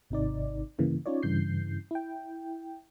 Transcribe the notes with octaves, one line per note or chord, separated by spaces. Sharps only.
G#1 C3 D#4 D5
G2 C#3 E3 A#3
C#4 D#4 F4 C#5 D5
G2 C#3 E3 G6 C7
E4 G5